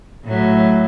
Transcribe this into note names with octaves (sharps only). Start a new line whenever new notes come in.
A2 F#3